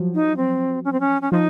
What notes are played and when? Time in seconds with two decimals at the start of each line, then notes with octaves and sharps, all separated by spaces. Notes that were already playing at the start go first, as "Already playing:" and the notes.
Already playing: F3 F#3
0.14 D#4
0.37 C4
0.84 C#4
0.92 C4
1.00 C#4
1.22 C#4
1.32 F3 D#4